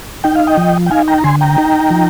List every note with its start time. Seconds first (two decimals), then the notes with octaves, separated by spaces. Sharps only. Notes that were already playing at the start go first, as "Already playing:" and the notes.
0.24 D#4 G5
0.35 F5
0.47 D#5 G5
0.58 F3
0.86 G5
0.91 D#4 F5 G#5
1.08 G5 A#5
1.18 A#5
1.24 D3 G#5 C6
1.41 G5 A#5
1.58 D#4
1.91 F3